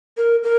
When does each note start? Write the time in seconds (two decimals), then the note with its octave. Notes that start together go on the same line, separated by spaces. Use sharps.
0.17 A#4
0.43 A#4